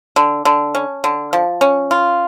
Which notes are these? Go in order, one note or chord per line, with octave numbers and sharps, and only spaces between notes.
D3
D3
C#4
D3
F3
C#4
F4